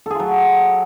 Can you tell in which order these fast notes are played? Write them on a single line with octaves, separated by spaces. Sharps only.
A4 G#4 F4 F#3